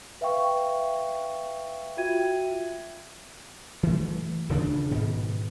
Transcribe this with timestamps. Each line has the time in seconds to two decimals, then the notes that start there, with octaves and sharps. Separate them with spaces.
0.21 B4 E5 F5 G5 C#6
1.97 F4 F#4 E5 G5 G#6 D#7
3.83 E3 A3
4.49 D#1 C#3 D4
4.91 G#2 B2 D#3